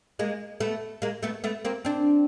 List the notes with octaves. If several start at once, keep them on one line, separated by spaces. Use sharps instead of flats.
G#3 A#3
A3 B3
G#3 A#3
A3 B3
A3 B3
A#3 C4
C4 D4